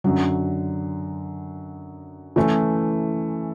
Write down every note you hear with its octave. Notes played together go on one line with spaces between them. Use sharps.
F#2 D3 F#3
E3 A3 C#4 E4